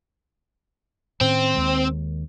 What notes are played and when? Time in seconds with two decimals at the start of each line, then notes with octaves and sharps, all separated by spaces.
1.21 A2 D#3 C4 C#4
1.55 D#2 D#3 G#3